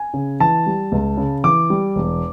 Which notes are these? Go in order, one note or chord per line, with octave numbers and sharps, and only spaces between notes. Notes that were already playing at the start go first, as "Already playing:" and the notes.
Already playing: G#5
C#3
E3 A5
G3
C#2
C#3
E3 D6
G3
E1